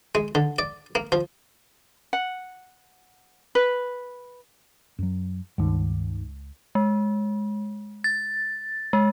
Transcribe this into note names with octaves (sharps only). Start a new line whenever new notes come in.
G#3
D3
D5
A#3
F3
F#5
B4
F#2 F#3
C#2 G2 D#3
G#3
A6
G#3